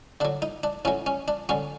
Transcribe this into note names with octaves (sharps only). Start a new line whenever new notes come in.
D3 F#3 D4
D#4
D4
A2 F#3 C#4
C#4
D4
D3 F#3 C#4